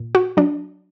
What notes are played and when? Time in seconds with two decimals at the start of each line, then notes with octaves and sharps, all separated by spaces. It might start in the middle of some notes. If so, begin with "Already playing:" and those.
Already playing: A#2
0.15 F#4
0.37 F#3 D4